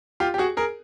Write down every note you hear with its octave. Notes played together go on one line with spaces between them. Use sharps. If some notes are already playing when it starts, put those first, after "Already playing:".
F4 G4
G4
F#4 G#4
G#4 A#4